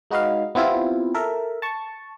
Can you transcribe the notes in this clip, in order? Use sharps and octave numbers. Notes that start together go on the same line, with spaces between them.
G#3 D#4 F#4 B4 D#5 F5
B3 C4 E4 F4 G4
A4 A#4 E5
A5 C#6